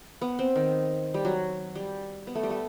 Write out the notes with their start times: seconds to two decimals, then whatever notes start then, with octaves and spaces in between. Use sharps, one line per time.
0.21 B3
0.39 C4
0.56 D#3
1.14 G3
1.25 F#3
1.75 G3
2.27 B3
2.35 A3
2.43 G3
2.50 A3